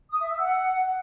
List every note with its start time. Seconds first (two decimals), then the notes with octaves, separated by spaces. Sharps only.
0.10 D#6
0.20 E5
0.30 E6
0.40 F#5